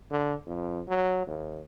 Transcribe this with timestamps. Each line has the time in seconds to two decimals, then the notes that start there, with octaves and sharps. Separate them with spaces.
0.11 D3
0.47 F2
0.88 F#3
1.27 D#2